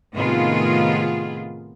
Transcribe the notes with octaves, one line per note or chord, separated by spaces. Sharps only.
A2 C3 D#3 B3 F4 G#4